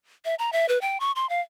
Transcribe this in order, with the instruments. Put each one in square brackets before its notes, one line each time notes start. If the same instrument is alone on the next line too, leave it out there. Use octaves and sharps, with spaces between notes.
[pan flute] E5
A#5
E5
B4
G5
C#6
C6
F5